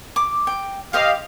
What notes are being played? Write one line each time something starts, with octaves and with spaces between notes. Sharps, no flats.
D6
G5
G4 C5 D#5 F5 D#6